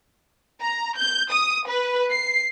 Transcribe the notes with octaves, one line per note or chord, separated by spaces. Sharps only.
A#5
G6
D#6
B4
C7